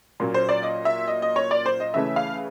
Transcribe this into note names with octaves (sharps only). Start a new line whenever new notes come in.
A#2 F#3 A#3 C#4
C5
D5
D#5
E5
D#5
D#5
C#5
D5
C5
D#5
C#3 E3 A3 C#4 E5
F5